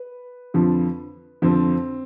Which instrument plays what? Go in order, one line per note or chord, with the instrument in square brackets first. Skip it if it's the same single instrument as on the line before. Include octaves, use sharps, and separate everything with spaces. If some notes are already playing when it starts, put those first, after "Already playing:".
Already playing: [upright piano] B4
F2 D3 F3
F2 D3 F3 C4